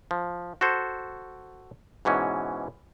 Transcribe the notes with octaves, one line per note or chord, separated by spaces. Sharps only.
F3
F#4 A4 C5
G#2 B2 E3 C#4